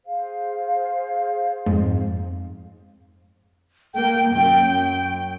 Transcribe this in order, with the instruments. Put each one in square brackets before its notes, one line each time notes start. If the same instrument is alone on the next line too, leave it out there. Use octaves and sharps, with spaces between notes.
[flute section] G#4 C5 F5
[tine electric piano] F2 [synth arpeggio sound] G#2
[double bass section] A#3 [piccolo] G5
[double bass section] F#2 [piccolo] G5